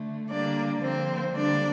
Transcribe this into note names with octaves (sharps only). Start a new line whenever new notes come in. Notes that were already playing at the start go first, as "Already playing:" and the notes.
Already playing: D3 A3
D3 G3 A#3 D4 D5
D3 F3 A#3 C4 C5
D3 G3 A#3 D4 D5